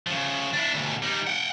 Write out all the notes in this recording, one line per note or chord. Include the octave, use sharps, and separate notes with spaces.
C#3 F3
D4 E4
D2 B2
G3 D#4
F#5 G5